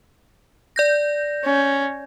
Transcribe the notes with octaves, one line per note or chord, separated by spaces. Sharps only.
D5 G6 A#6
C#4